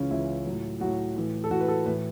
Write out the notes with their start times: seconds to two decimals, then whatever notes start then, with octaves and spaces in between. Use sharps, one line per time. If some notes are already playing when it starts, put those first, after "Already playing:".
Already playing: C#2 C#3 E3 C#4
0.10 C#2 C#3 E3 E4
0.46 A2 F#3
0.80 A2 F#3 F#4
1.16 A2 E3
1.44 A4
1.51 A2 E3 F#4
1.61 B4
1.68 A4
1.85 A2 E3 B4